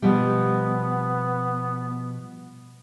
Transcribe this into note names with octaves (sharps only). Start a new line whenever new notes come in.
B2 F3 G3 B3